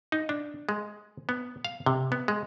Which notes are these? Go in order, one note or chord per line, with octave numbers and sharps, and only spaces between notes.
D#4
D4
G#3
B3
F5
C3
B3
G#3